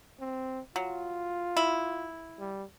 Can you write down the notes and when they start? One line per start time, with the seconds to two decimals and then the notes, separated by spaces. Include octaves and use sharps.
0.20 C4
0.76 F#3 F4
1.57 E4
2.40 G3